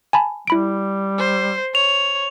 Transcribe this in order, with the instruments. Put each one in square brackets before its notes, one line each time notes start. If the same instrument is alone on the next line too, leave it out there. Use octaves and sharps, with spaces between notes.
[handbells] G#5 A5 B5
[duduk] G3 [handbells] E4 B5 D7
[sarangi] C5
[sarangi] C#5 [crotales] F7